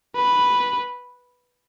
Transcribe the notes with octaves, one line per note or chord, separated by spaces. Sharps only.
B4